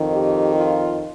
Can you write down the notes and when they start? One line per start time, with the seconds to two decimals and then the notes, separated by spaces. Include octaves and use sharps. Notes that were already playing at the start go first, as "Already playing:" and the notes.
Already playing: F2 D#3
0.14 G4
0.55 F4